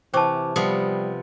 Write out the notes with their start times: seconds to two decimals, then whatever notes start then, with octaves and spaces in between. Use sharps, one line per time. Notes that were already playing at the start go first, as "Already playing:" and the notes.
0.14 C3 E3 C5 G5 A5 C#6 D6
0.56 C3 F3 G3 B3 D#6